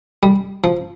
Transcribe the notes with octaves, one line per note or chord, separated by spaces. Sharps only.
G3
F3